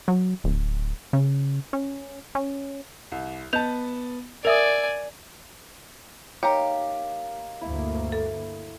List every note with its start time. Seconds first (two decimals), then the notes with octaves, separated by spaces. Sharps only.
0.08 F#3
0.44 D1
1.13 C#3
1.73 C#4
2.35 C#4
3.12 C2
3.53 B3 D#5 A5 G6 F7
4.45 A#4 D5 E5 G#5 D#6 E6
6.43 A#3 D#4 G4 C#5 F5 A#5
7.61 D2 G2 A#3 E4
8.12 A4